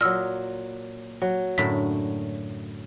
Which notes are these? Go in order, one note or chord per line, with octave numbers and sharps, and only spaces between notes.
A#2 F#3 D#5 E6 F6
F#3
F#2 A2 D3 B6